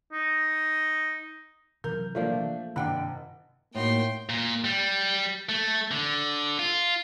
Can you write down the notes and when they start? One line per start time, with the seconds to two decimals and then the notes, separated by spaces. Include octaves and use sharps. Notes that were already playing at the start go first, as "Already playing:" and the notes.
0.12 D#4
1.84 C3 E3 F#3 A#4 G6
2.15 A#2 F3 A3 A#3 D4
2.76 F#1 G2 C3 D#3 D4 F#5 G5 B5
3.74 A2 A#3 D#4 F#4 G5 C6
4.29 A#2
4.64 G3
5.49 A3
5.91 D3
6.59 F4